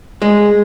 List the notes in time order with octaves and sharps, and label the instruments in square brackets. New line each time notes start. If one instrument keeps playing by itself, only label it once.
[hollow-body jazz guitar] G#3